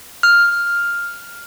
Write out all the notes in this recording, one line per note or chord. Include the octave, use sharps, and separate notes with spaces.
F6